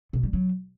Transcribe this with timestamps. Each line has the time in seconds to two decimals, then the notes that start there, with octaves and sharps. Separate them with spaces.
0.13 B2
0.23 G3
0.33 F#3